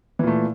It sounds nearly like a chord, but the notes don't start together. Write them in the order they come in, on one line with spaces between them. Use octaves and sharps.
E3 A#2 A3